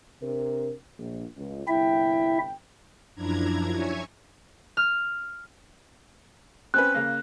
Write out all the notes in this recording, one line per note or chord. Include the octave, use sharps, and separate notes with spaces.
C3 D4 A#4
A#1
C#2
G1 C2 E4 E5 G5
F#2 F3 D4 E4 A#5 G#6
C#5 E5 G#5 C#6
F6
C4 C#4 B4 F#6
C#3 A#3